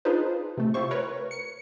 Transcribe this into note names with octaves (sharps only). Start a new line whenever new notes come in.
D4 D#4 F4 G#4 B4 C5
C3 A3
E4 F4 G4 C5 C#6
A#4 B4 C#5
C#7